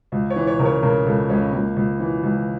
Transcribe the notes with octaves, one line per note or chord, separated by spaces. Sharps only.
C#2
C#5
E3
C#5
C#3 A#4
C#5
C#3 A#4
C#2 A4
C#2 C#4
C#2 A#3
C#2
E3
C#2